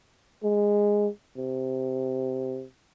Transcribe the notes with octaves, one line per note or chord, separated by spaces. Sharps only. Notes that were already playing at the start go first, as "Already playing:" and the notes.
G#3
C3